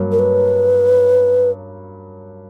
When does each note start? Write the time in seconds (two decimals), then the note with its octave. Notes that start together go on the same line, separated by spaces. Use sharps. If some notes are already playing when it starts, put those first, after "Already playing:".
Already playing: G2 F#3 A#3 C#4
0.12 A#4
0.19 B4